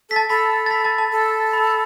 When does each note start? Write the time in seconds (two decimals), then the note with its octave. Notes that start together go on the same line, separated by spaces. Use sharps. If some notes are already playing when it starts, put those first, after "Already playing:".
0.09 A4 B6
0.16 A5 A6
0.29 A4 B5 B6
0.66 A6
0.70 B5 B6
0.84 A5 A6
0.98 A5
1.11 A4
1.53 B5